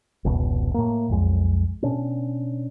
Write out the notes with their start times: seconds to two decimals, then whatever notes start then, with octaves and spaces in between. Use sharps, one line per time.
0.25 F1 C#2 B2
0.74 A2 A#3
1.10 B1 F2 G#3
1.83 B2 C#4 D4